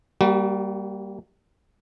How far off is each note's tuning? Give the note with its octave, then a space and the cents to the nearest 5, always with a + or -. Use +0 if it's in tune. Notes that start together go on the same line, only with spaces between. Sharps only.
G3 +0 A#3 +0 F#4 +45